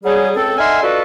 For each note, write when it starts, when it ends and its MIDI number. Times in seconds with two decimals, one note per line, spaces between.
0.04 0.30 54
0.04 0.30 55
0.04 0.30 68
0.35 0.58 37
0.35 0.58 60
0.35 0.58 69
0.58 0.82 50
0.58 0.82 63
0.58 0.82 76
0.58 0.82 80
0.58 0.82 84
0.58 0.82 89
0.83 1.02 62
0.83 1.02 65
0.83 1.02 66
0.83 1.02 69
0.83 1.02 71
0.83 1.02 75